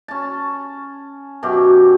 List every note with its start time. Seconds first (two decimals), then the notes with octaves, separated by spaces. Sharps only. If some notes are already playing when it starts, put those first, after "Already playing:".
0.08 C#4 A5
1.43 F#2 B2 G4